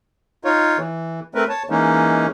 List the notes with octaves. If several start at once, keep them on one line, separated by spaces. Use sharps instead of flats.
D#4 F4 C#5
E3
A3 C4 A#4 B4
C#5 A5
E3 G#3 A#3 C#4 D#4